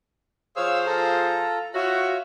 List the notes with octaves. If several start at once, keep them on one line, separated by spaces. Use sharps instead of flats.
F3 G#4 C5 C#5 F5 E6
F4 A4 A#5
F4 F#4 C#5 E5